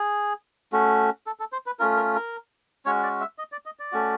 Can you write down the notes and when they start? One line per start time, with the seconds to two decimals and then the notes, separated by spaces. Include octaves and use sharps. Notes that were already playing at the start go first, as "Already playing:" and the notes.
Already playing: G#4
0.73 A3 C#4 F#4
1.27 A4
1.40 A4
1.52 C5
1.66 B4
1.79 A3 C#4 F4 A#4
1.96 A#4
2.15 A#4
2.86 G#3 C#4 F#4 C#5
3.03 D5
3.21 E5
3.38 D#5
3.52 D5
3.66 D#5
3.79 D5
3.92 A3 C#4 F#4